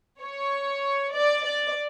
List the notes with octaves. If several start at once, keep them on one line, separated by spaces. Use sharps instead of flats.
C#5
D5
D5